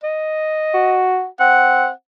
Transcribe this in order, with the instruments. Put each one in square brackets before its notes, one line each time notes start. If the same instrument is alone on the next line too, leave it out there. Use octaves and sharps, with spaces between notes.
[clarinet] D#5
[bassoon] F#4
[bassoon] C4 [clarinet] F#5